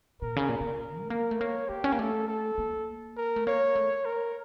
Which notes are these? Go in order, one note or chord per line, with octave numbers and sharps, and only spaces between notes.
A#2 A#4
C#3
A#2
C#3
A#4
A3
A#3 A#4
A3
A#3 C#5
A#3 G4
C#4
A#3
A3 A4
A4
A#3
A#4
A3
A#3 C#5
A3
A#4